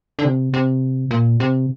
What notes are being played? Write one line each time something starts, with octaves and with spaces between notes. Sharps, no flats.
D3
C3
C3
A#2
C3